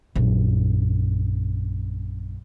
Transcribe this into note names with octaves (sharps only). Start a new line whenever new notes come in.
A#1 F#2